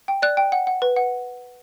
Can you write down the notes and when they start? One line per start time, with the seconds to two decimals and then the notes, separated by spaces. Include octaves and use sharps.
0.08 G5
0.22 D5 F#6
0.37 G5
0.52 F#5
0.67 F#5
0.82 B4
0.96 F#5